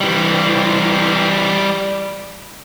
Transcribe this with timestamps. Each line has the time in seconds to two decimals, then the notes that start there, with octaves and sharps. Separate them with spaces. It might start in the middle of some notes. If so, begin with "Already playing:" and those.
0.01 E3 G3